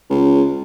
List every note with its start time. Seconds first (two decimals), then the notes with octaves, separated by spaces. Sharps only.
0.10 C#2